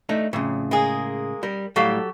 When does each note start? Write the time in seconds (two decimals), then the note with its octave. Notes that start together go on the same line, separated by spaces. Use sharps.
0.09 A3 D4 D#4
0.33 F2 A2 C#3
0.71 G#3 A#3 G#4
1.43 G3 A#4
1.76 A2 F#3 G3 G4 A4 F5